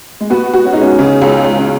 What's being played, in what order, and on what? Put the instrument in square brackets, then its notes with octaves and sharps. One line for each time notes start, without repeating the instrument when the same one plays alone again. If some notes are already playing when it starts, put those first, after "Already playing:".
[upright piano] G#3
[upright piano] B3 [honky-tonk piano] F#4
[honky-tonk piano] F#4
[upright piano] C#4
D#4
[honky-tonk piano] G#3 [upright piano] C#4
[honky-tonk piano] C#3 [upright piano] D#4
[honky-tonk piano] C#2
C#2
[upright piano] C#4